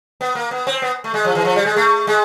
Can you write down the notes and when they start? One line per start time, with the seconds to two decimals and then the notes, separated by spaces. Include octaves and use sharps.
0.21 B3
0.35 A#3
0.51 B3
0.67 C4
0.82 B3
1.04 A3
1.14 G#3
1.25 F3
1.35 E3
1.45 F3
1.56 G3
1.66 G#3
1.76 A3
2.07 G#3